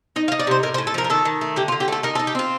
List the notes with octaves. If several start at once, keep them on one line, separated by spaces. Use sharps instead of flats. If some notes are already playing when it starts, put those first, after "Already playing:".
D#4 D#5
F5
D#4
D5
C3 C5
A2 A#4
C5
A2
A4
F3 A#4
A#4
D#3 A4
D#3
A3
D3 G4
F4
D3
G4
A3 A4
D#4 A#4
A4
D#4
G4
C4 F4